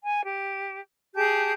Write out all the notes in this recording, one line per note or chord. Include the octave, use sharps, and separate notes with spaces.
G#5
G4
G4 G#4 A5 G6